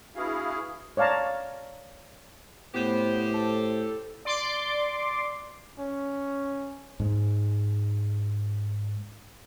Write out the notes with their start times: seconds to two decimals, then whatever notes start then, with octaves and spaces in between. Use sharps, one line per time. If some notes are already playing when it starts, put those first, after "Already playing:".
0.16 B3 D4 E4 F#4 G#4 F5
0.97 C#5 D5 F5 A5 A#5
2.75 A2 B3 G4 C5
3.34 A4
4.25 D5 C6 D6
5.79 C#4
7.00 G#2 G#3